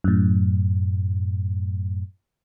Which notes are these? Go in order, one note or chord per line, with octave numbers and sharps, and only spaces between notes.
F#2 A2